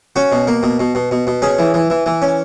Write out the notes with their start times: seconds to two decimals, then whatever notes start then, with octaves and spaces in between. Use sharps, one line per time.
0.16 C#4 F#4
0.32 B2
0.47 A#3
0.63 B2
0.79 B2
0.95 B2
1.11 B2
1.27 B2
1.42 C#4 G#4
1.59 E3
1.74 E3
1.90 E3
2.06 E3
2.22 C#4